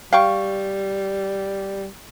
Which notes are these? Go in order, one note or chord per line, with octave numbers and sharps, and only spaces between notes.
G3 F5 G5 C#6